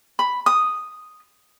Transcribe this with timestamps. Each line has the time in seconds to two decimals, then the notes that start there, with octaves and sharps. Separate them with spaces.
0.19 B5
0.46 D#6